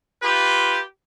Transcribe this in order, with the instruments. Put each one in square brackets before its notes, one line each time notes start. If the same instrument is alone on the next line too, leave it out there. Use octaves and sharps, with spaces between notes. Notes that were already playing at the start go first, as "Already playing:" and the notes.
[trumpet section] F4 G4 B4